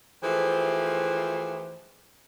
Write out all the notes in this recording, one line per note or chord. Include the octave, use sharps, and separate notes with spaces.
E3 F3 A3 G4 G#4 C5